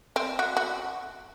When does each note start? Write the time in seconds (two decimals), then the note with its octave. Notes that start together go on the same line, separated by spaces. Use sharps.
0.16 C4
0.39 F#4
0.57 F#4